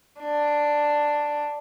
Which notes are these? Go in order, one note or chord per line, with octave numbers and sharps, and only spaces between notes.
D4